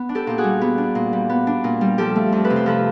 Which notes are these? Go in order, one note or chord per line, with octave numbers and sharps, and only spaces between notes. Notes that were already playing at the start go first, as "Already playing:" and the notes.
Already playing: B3
D4
G4 A4
A#2 G4
F#4 G#4
G3
B3
D4
A#2
G3
B3
D4
A#2
G3
F3 G4 A4
A3
F2
A4 B4
C3
C5
F3 A4 B4